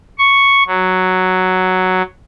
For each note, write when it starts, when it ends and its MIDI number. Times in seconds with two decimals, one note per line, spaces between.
0.19 0.64 85
0.67 2.02 54